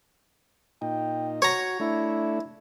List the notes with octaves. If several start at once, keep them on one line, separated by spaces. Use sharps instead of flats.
A#2 D#4 G5
F#4 C#5 A#5
A3 D4 E4